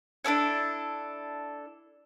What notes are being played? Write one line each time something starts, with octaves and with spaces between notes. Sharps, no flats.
D4 E4 A4 C#5